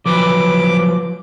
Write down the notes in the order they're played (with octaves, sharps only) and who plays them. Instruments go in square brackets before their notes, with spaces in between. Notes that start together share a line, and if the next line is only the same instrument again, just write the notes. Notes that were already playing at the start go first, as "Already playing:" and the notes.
[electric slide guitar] F3 F#3 B4 [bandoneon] D6